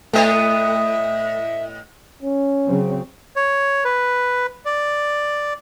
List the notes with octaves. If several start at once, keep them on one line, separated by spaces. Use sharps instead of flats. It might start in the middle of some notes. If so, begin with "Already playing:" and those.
A2 A3 B3 D#5 E5
C#4
C#3 F#3 C4
C#5
B4
D5